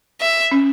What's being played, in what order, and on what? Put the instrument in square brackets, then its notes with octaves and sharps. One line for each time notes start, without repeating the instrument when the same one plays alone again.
[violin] E5
[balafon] C#4